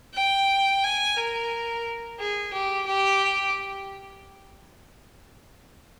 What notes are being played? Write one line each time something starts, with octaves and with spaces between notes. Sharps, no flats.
G5
G#5
A#4
G#4
G4
G4